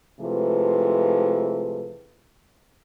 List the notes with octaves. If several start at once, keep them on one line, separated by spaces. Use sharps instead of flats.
C3 E3 F3 G#3 A3 B4